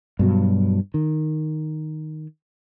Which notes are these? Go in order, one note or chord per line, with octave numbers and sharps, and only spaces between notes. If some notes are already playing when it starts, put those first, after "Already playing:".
G2 B2 F#3
D#3